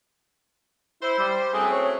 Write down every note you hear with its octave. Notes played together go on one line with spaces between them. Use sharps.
E4 C5
G3
F#2 A2 C4 G#4
C#5